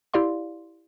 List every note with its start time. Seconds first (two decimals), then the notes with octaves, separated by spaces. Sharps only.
0.14 E4 G4 D5 F5 C6